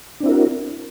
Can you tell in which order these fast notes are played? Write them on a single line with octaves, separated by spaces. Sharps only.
D4 C4 E4 A#4 F#4